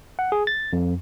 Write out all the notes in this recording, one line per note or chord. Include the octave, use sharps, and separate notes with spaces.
F#5
G#4
A6
F2